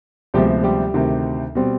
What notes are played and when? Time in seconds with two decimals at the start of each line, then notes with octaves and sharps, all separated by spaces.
0.34 D2 C3 F3 G3 G#3 B3 G4
0.63 G3 G4
0.94 D2 C3 D#3
1.55 B2 G3 C4